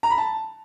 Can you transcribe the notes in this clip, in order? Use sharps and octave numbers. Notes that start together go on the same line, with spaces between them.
A#5
B5
A5